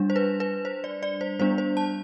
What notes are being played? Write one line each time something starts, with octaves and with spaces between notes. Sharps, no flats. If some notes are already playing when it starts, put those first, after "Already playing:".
Already playing: G3 D4
C5
B4
B4
C5
D5
D5
C5
G3 B3 D4 C5
C5
A5